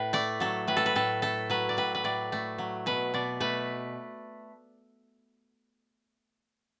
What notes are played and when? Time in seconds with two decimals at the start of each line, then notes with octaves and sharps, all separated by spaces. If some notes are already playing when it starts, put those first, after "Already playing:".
Already playing: A2 B4
0.13 A3 D5
0.40 F#3 A4
0.67 A2 B4
0.77 A4
0.86 B4
0.95 A2 A4
1.22 A3 A4
1.50 F#3 B4
1.69 D5
1.77 A2 B4
1.95 B4
2.04 A2 D5
2.32 A3
2.58 F#3
2.86 B2 B4
3.14 B2 D5
3.40 A3 B4